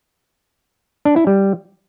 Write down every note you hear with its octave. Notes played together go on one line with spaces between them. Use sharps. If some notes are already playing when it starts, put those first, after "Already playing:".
D4
E4
G3